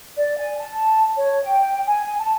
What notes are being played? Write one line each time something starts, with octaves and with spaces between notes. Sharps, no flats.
D5
G#5
A5
C#5
G5
G#5
A5